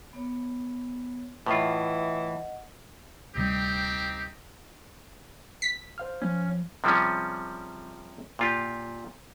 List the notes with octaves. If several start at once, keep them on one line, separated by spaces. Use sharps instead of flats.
B3 C#5
A2 E3 F4 D#5 F#5
D2 C3 G3 C4 D#4 G4
B6
C5 F5 F6
F3 C#4
C3 F3 G3 G#3 C#4
A#2 F4 G4